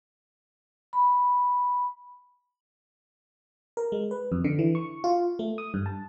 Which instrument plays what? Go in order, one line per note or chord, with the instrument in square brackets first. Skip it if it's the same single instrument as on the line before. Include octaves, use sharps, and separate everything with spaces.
[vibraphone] B5
[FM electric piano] A#4
G#3
B4
F2
D3
E3
C#6
F4
A3
D#6
G2
A5